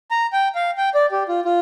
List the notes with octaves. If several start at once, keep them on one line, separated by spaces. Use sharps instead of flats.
A#5
G5
F5
G5
D5
G4
F4
F4